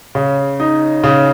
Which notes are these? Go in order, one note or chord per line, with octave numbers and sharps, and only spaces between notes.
C#3
D#4
C#3